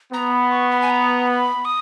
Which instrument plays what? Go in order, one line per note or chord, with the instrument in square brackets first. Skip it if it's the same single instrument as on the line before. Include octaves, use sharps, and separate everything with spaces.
[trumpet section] B3 [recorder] A#5
[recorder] B5
C#6
B5
G#5
A#5
B5
D#6